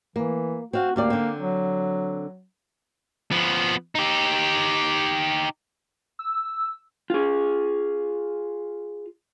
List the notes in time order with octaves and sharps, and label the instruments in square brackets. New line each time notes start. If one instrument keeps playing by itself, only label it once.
[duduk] E3 [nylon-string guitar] A#3
[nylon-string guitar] C4 F5 [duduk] F#4
[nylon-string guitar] D2 G4 D5 [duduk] A#3
[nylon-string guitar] D3 C4
[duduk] F#3
[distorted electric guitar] F3 B3
D#4 G4
[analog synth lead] E6
[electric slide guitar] F4 G#4